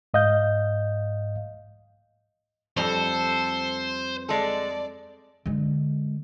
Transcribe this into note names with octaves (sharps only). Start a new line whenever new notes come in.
G#2 D#5 F5 G6
F2 G3 A4 C5
G#3 A4 D5
D3 G#3